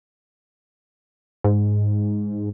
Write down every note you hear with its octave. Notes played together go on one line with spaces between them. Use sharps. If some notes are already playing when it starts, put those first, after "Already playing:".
G#2